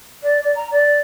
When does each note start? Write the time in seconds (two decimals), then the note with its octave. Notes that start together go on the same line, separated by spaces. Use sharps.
0.23 D5
0.42 D5
0.56 A#5
0.71 D5